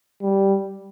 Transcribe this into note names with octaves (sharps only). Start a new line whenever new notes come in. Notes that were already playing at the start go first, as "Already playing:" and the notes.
G3